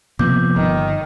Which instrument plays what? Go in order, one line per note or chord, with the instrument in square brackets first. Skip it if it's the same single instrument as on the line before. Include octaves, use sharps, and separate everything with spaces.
[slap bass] C3 A#3 [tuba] F3 [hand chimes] B3 D6 G6
[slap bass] G1 [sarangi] D#3